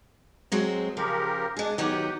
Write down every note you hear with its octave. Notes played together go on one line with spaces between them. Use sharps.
F#3 G#3 C4
C#3 F3 G4 A#4
G#3 D4 G#4
D#3 F#3 B3 G4